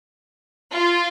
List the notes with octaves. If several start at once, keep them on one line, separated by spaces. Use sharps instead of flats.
F4